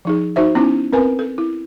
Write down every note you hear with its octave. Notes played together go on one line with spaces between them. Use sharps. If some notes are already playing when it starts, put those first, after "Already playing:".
F3 D#4 G#4
D#4 F#4 C5 E5
B3 C#4 D#4 E4
C4 A#4 B4 G#5
A4
E4